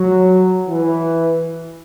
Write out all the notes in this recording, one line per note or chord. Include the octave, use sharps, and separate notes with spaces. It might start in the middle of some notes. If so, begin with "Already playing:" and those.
Already playing: F#3
E3